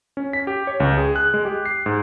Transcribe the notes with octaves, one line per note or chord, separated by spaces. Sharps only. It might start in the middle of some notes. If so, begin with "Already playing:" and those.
C#4
B6
G4
C#5
C#2
G#4
F#6
G#3
G4
C7
G#2